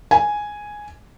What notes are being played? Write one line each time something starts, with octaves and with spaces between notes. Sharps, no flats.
G#5